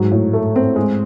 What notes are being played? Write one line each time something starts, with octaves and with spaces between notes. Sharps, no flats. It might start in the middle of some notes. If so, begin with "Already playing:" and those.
Already playing: G#2 F#3
A2
A3
C4
G#3